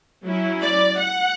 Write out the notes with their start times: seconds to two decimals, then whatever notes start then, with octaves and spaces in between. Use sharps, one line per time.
0.24 F#3 C#4 E4
0.61 D5
1.00 F#5